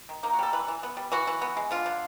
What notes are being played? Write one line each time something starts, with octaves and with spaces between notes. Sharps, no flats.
D#3
A#3 D#4
F#4
G3 A4
E3 B4
E3
B3
G3
E3 F#4
E3
B3
G#3
D3 F4
D3